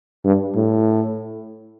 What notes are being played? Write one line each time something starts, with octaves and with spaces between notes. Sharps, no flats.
G2
A2